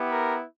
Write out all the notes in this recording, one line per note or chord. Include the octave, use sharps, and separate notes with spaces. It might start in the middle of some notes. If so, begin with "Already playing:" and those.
Already playing: B3 E4 G4
A#4